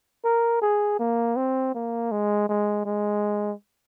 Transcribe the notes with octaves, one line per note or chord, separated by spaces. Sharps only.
A#4
G#4
A#3
C4
A#3
G#3
G#3
G#3